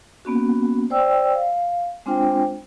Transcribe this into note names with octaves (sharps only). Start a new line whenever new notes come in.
A#3 B3 C#4 F#4
C5 D5 G5 E6
F5
G#3 C4 D4 F4 C5 G5